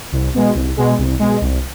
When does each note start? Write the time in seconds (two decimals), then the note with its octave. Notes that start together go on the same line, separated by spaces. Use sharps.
0.12 C2
0.34 B2 G#3
0.55 C2
0.77 B2 G#3
0.98 C2
1.19 B2 G#3
1.41 C2